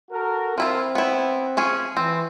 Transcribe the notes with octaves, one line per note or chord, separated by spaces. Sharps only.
F#4 A4 A#4
F3 C4 E4 F4
B3 E4
F3 C#4 G#4
E3 C4